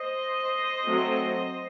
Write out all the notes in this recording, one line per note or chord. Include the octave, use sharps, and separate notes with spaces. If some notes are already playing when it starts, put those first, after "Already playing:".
Already playing: C5 D#5
F#3 A3 C4